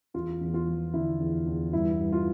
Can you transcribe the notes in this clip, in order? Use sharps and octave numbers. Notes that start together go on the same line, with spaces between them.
E2 F4
E2
F4
F3
D3 E4
E2
E2
G2 E4
G2
F4